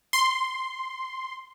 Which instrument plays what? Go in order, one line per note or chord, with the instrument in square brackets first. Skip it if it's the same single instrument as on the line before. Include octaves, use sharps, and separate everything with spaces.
[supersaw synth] C6